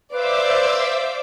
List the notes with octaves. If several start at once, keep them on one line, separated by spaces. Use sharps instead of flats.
B4 C5 D5 E5 F5 D6 E6